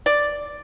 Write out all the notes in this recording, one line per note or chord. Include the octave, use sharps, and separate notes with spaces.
D5